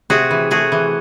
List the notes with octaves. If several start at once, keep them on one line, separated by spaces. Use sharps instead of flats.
C3 F#4 G#4
E3
A3 F#4 G#4
E3